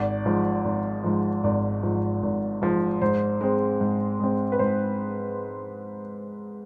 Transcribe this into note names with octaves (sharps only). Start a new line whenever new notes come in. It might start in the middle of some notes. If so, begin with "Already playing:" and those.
Already playing: G#1 D5
G#2 F3
G#1
G#2 F3
G#1 D5
G#2 F3
G#1
G#2 F3
G#2 C5
G#3 C4
G#2
G#3 C4
B4
G#2 C5